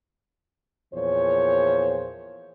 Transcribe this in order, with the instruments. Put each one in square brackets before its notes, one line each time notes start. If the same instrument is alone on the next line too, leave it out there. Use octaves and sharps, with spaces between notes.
[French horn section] E2 A#2 F3 C5 C#5